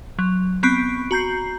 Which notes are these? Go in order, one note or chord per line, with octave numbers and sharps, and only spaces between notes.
F#3
B3 C4 B5 C#6 F#6 D7
F#4 A#5 G6 C7